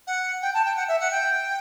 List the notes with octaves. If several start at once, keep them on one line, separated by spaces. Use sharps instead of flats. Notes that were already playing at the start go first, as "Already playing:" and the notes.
F#5
G5
A5
G5
F#5
E5
F#5
G5